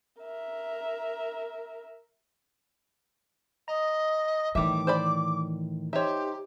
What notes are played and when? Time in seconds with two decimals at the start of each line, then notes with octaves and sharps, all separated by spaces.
0.21 A#4 E5
3.68 D#5 A#5
4.55 A2 D#3 E3 G3 E5 D6
4.87 C5 D5 B5
5.93 D#4 G4 C5 C#5 E5